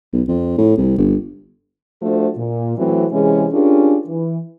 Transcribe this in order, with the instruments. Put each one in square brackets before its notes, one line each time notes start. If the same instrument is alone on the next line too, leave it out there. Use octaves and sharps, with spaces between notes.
[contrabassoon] B1
F2
A2
C2
G1
[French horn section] F3 A3 D4 F#4 A4 C5
A#2
E3 F#3 A3 C4
C3 E3 G#3 C#4 G#4
C#4 D4 F4 G4 G#4 A#4
E3